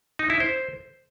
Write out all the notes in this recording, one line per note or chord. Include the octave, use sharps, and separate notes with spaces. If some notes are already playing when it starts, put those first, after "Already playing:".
D#4
E4
C5